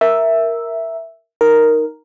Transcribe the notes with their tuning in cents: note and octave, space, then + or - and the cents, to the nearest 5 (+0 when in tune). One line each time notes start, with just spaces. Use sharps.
A#4 +0 E5 +0
D#4 +0 A#4 +0